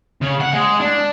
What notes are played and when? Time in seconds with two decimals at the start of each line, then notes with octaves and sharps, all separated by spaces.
0.21 C#3
0.40 F#5
0.53 G#3
0.80 D4